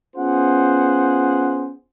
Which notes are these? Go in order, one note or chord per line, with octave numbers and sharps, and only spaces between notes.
B3 C#4 F4 G#4 C5 F#5